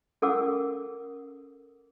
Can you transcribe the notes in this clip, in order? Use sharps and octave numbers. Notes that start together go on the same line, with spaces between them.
C#4 A4 A#4 F#5 D6 E6